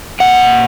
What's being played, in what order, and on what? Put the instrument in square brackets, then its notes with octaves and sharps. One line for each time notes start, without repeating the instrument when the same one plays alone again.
[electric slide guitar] A#2 F#5